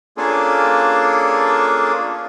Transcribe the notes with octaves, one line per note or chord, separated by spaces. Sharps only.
A#3 C#4 D4 F4 G#4 A4